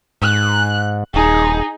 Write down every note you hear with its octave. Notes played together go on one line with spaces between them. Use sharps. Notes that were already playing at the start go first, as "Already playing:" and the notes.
G#2 F#6
D#1 D#4 G#4